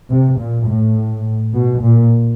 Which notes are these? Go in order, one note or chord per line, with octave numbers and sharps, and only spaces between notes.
C3
A#2
A2
B2
A#2